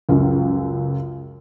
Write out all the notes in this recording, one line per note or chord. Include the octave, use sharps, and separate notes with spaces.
C#2 F#2